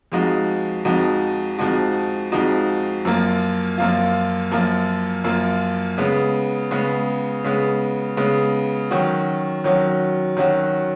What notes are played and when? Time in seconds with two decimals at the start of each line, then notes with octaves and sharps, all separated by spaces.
0.12 F2 F3 G#3 D#4 F#4
0.85 F2 F3 G#3 D#4 F#4
1.58 F2 F3 G#3 D#4 F#4
2.32 F2 F3 G#3 D#4 F#4
3.05 F#2 F3 A#3 F4
3.78 F#2 F3 A#3 F4
4.51 F#2 F3 A#3 F4
5.24 F#2 F3 A#3 F4
5.98 C#3 G#3 B3
6.71 C#3 G#3 B3
7.44 C#3 G#3 B3
8.17 C#3 G#3 B3
8.91 D#3 F#3 C#4 F#4
9.64 D#3 F#3 C#4 F#4
10.37 D#3 F#3 C#4 F#4